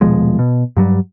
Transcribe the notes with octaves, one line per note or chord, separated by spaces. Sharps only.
D#1 B2 F3 G#3
B2
G2 F#3 G3